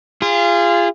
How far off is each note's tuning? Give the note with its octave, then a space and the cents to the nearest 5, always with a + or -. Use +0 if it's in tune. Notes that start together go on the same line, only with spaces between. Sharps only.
F4 -20 G#4 -30